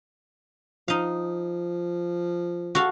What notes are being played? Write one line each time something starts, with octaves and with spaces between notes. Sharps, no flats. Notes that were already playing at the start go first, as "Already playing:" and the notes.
F3 D#4 F5
F#4 A4 F5